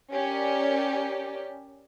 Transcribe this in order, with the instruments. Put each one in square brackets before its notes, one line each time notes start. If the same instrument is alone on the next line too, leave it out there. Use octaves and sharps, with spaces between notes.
[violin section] C#4 G4 A#4 D5